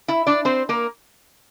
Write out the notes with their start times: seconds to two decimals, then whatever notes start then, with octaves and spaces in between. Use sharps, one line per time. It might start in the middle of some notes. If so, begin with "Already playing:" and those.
0.08 E4 E5
0.27 D4 D5
0.45 C4 C5
0.69 A#3 A#4